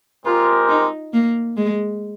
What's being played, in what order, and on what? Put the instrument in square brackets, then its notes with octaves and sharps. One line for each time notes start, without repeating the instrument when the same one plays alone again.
[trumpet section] G#3 C4 G4 A#4 [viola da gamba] F4
[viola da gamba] D#4
A#3
G#3